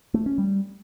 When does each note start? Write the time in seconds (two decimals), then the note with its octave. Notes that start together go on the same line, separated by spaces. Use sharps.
0.14 A3
0.26 C#4
0.38 G3